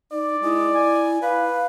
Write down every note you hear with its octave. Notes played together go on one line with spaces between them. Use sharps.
D#4 D5
G#3 E4
G#5
B4 F5